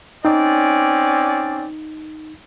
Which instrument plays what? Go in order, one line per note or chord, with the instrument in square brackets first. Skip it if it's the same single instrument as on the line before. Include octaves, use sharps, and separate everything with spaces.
[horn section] C4 C#4 D5 [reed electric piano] D#4